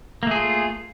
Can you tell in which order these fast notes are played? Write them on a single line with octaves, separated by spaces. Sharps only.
A#3 A3 G#4 F4